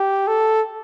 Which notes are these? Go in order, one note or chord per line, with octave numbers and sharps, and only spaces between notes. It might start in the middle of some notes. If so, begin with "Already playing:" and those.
Already playing: G4
A4